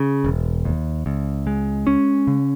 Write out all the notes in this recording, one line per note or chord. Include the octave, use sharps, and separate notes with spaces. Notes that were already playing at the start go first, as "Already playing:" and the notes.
Already playing: C#3
E1
D#2
C#2
G#3
C#4
C#3